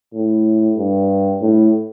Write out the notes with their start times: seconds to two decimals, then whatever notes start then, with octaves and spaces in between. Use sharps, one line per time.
0.14 A2
0.78 G2
1.41 A2